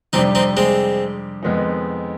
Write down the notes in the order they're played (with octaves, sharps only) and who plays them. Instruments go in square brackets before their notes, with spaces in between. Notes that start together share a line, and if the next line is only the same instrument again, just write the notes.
[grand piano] F2 C3 G3 D4 G4 [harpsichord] C4 D#4
[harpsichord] C4 D#4
G#3 C4
[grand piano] F2 D#3 G#3 B3 D#4